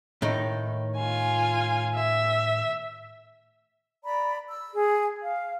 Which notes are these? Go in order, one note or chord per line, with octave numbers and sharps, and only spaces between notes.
A2 D#3 D#4
F4 G#5
E5
D5 A#5 B5
E6
G#4
F5